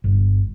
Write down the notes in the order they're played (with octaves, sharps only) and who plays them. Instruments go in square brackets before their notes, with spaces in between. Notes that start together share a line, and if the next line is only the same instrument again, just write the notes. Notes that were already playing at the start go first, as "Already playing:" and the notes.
[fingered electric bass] G1